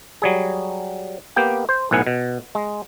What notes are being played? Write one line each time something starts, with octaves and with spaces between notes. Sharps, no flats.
F#3 G3 G#4
A#3 B3 G4 G5
C5
B1 A2 B3 F#5 G#5
B2
G#3